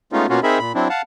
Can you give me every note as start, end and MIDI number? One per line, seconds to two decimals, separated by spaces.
0.12 0.26 56
0.12 0.26 57
0.12 0.26 59
0.12 0.26 61
0.12 0.26 63
0.12 0.26 65
0.29 0.40 47
0.29 0.40 58
0.29 0.40 61
0.29 0.40 65
0.29 0.40 66
0.43 0.59 60
0.43 0.59 63
0.43 0.59 68
0.43 0.59 70
0.43 0.59 76
0.43 0.59 83
0.59 0.72 46
0.59 0.72 83
0.75 0.88 54
0.75 0.88 60
0.75 0.88 62
0.75 0.88 64
0.90 1.02 77
0.90 1.02 78
0.90 1.02 81